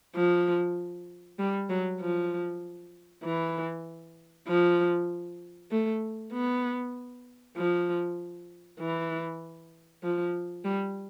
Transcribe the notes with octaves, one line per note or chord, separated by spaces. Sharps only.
F3
G3
F#3
F3
E3
F3
A3
B3
F3
E3
F3
G3